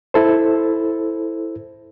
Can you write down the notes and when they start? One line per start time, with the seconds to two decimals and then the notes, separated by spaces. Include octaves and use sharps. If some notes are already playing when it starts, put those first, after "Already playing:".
0.14 E4 A4 C5